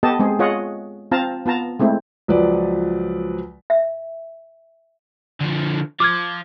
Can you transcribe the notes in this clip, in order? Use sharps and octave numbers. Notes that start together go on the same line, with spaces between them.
B3 G4 A4 D#5 A5
G#3 C4 G#4
F4 G#4 C#5 D#5 F#5
C4 F4 F5 A5 A#5
B3 F4 A5 A#5
G#3 A3 C4 E4
C#2 F3 F#3 B4 D5
E5
D3 F3
F3 D6 F6 G#6